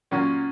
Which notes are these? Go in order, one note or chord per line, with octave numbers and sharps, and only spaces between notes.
A#2 F#3 A#3 C#4 F#4